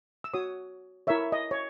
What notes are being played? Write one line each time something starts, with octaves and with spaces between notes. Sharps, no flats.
E6
F#4 C#5 D#6
E4 A#4 C#5 E5
D#5
C#5